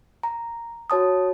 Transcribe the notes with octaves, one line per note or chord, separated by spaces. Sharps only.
A#5
F#4 C#5 A5 D#6